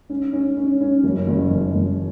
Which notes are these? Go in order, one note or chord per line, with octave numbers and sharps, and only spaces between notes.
C#4
C#4
C#4
C#4
F#1
F#1
F#1
F#1